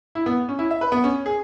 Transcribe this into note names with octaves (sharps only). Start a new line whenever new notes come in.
E4
B3
C#4
E4
E5
B4
B3
C#4
G#4